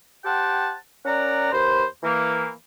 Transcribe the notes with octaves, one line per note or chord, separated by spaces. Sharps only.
G4 C5 F#5 G5 A5
C#4 A#4 D5 F#5 A#5
D#2 B4 C5
E3 A#3